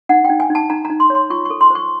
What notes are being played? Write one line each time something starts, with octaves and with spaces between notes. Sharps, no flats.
D#4 F#5
D#4 G5
G#5
D#4
A5
D#4 A#5
D#4 A#5
C6
C#5
C6
F4 C#6
C#6
A4
C6
C5 C#6